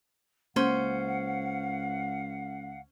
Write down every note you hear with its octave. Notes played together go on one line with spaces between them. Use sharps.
C#2 A#3 C#4 C5 F5 F#5